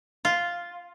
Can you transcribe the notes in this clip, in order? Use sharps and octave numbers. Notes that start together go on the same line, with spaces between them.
F4